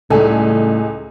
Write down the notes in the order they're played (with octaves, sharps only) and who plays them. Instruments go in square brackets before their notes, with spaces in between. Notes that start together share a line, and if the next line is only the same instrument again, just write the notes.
[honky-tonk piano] C#2 G#5 [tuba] A2 [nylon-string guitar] G3 A3 D#4 [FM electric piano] A4